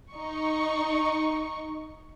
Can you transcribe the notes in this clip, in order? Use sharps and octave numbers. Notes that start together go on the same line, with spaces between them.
D#4 C#6